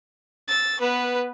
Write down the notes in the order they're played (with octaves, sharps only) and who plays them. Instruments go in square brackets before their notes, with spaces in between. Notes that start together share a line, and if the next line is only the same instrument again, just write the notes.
[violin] E6 A6
B3 B4